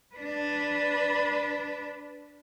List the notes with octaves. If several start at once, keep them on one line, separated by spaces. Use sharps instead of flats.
D4 B4